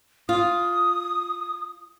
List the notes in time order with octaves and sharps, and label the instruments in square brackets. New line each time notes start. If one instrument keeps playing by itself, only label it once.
[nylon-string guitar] F4 [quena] D#6